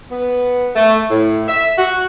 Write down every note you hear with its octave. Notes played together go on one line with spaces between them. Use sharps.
B3
A3
A2
E5
F#4